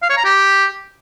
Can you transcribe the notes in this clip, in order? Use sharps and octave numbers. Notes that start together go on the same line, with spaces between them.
F5
C#5
A#5
G4